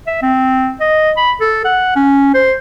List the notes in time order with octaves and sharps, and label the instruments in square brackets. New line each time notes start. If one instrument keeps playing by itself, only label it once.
[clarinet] E5
C4
D#5
B5
A4
F#5
C#4
C5